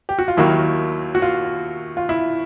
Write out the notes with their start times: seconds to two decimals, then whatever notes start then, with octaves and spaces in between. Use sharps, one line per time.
0.09 G4
0.19 F#4
0.28 F4
0.37 D#2 D#3 F#3 A#3 E4
1.15 F#4
1.22 F4
1.97 F4
2.09 E4